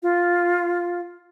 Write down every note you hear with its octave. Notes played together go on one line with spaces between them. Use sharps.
F4